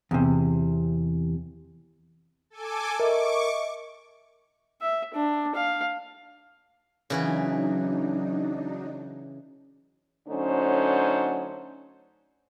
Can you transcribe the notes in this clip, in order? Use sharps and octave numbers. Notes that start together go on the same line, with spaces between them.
E2 C3
A4 G#5 D6
A#4 D#5 E5 C#6 D6
E5
D4
F5
C#3 E3 F#3 D4 D#4 F#4
D3 F#3 A3 C#4 D#4 C5